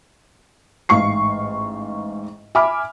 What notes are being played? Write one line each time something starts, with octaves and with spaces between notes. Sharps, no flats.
A1 G#2 F5 C#6 C7
E5 G#5 B5 D6 F6